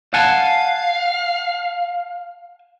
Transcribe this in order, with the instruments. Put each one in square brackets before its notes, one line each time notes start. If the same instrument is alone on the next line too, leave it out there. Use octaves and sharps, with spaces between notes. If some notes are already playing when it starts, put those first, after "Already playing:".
[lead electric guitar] F5 [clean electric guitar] F#5 G#5 A5